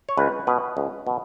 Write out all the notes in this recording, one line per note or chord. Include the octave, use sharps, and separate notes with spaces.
C#5
C#2 B4
B2 B4
C#2
B2